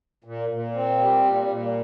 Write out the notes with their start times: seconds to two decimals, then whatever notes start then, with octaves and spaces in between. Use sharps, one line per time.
0.24 A#2
0.49 A#2
0.74 C4
0.98 G3
1.23 A#2
1.47 A#2